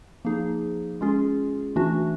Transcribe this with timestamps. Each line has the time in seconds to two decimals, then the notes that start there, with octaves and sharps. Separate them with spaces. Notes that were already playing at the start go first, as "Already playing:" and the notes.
0.25 F3 A#3 D#4 G#4
1.01 G#3 C#4 F4 G#4
1.76 E3 A3 D4 F#4